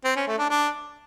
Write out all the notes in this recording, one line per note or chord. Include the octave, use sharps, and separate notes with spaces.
C4
C#4
A3
D4
D4